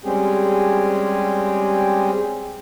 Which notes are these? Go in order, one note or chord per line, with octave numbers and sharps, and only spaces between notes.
G3 G#3 C4 C#4 G4 G#4